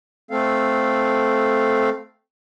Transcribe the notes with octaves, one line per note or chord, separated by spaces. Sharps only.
A3 C4 A4 F5